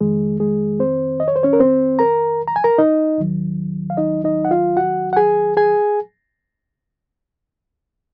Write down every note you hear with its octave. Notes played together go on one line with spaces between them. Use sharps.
F2 D#3 G#3 G#4
G#3 G#4
C4 C5
D#5
C#5
C5
C#4 C#5
A#4
C4 C5
A#4 A#5
A#5
G#5
A#4 A#5
D#4 D#5
D#2 D#3 F#3
F5
D#4 D#5
D#4 D#5
F#5
F4 F5
F#4 F#5
F#5
G#4 G#5
G#4 G#5